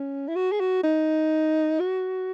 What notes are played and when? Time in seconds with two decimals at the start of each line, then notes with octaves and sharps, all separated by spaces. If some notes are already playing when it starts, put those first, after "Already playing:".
Already playing: C#4
0.28 E4
0.36 F#4
0.52 G#4
0.60 F#4
0.83 D#4
1.80 F#4